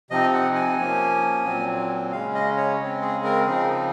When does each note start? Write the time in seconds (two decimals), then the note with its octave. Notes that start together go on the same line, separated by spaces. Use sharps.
0.10 C3 F3 C4 D#4 D#5
0.33 F#5
0.55 G#5
0.78 F3 A#3 C#4
1.45 A#2 F#3 C4
2.12 C#3 G#3 C#4 F5
2.35 D#5
2.57 C#5
2.80 C#3 G#3 C4
3.01 G#4
3.24 A#4
3.46 C#3 F3 C4 D#4 G#4